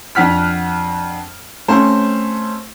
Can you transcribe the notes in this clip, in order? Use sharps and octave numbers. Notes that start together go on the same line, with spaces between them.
F2 D4 F#5 F6 B6
A3 C4 C#4 C5